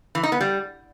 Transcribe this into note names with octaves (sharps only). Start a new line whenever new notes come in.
E3
D#4
B3
G3